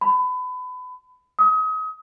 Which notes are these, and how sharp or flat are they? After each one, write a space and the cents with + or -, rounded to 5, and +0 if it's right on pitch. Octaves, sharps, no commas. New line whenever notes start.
B5 +30
D#6 +30